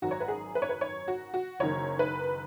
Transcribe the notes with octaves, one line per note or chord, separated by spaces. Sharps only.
G#1 F#2 D#3 F#4
C#5
B4
G#4
B4
C#5
B4
C#5
F#4
F#4
F#1 F#2 D#3 C#5
B4